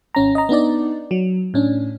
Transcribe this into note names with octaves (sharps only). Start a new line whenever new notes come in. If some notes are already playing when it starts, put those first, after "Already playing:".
G#1 C#4 A#5
D#5 A#5
B3 D4 D#4 D5
F#3
A2 C#4 D4